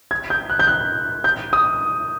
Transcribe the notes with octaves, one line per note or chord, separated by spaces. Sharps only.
G#6
G6
F#6
G6
F#6
G6
D#6